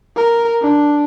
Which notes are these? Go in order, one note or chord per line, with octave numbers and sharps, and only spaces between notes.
A#4
D4